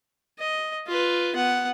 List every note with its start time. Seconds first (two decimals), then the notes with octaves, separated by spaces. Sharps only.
0.39 D#5
0.87 F4 B4
1.35 B3 F#5